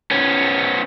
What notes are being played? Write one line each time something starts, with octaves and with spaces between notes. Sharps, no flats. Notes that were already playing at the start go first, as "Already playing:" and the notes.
B3 C#4